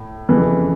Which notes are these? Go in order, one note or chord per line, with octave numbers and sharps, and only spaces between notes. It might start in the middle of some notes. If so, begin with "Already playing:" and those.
Already playing: A2
F2 C#3 E3